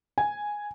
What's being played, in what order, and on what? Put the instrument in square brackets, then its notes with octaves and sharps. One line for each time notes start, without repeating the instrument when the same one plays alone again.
[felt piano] G#5